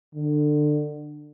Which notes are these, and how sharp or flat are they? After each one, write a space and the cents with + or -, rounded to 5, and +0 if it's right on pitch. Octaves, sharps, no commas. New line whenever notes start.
D3 +25